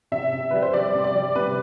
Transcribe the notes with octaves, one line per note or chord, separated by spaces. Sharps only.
C3 E5
C3
G3 B4
C5
G3 D5
C3
D5
G3
C3 B4